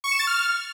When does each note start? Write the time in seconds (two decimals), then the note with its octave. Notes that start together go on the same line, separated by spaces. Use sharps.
0.04 C#6
0.12 E7
0.19 A6
0.27 F6